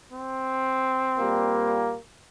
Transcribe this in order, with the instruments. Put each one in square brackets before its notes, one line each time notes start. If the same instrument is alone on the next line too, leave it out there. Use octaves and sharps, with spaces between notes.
[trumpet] C4
[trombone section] A#2 G3 A#3